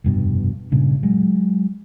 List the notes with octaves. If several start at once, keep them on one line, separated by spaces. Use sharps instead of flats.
F1 G2 B2
G2 A#2 C#3
F#3 G#3